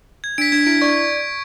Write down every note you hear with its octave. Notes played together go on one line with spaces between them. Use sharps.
G#6
D4 B6 D7
D4 G#6
E4 B6 D7
D5 C#6